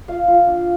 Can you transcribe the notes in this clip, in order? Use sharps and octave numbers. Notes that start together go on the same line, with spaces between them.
F4 F5
F4
D4